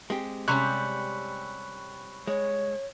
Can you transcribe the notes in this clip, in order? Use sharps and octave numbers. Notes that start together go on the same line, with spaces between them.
G#3 C4 G4
C3 G3 C#4 B5 C#6 F#6
G#3 C#5